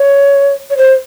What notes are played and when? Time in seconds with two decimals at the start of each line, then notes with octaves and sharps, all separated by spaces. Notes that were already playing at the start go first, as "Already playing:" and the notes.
Already playing: C#5
0.70 C#5
0.77 C5